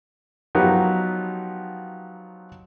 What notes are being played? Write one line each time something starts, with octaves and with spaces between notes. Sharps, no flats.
F3 F#3 B3 D#4 G4